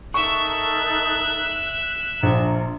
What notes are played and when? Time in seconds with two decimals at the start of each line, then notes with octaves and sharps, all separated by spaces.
0.14 D#4 A4 A#4 E5 C#6 F#6
2.23 A#1 D4 F4 A#5